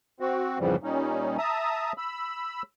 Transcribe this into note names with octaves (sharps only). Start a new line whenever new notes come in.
C4 F#4
F2 G#2 C#3 E3 F3 G3
A#2 G3 C#4 D#4
E5 A5 A#5 D#6
B5 E6